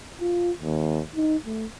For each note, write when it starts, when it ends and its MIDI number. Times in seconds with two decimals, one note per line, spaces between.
0.21 0.52 65
0.63 1.01 39
1.16 1.36 63
1.46 1.66 57